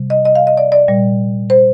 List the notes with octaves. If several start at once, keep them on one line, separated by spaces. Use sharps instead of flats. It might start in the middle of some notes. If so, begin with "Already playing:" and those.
Already playing: C3 G3
D#5
D#5
F5
D#5
D5
D5
A#2 G3
C5